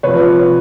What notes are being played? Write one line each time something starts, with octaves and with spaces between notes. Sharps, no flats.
C3 F3 B4 C#5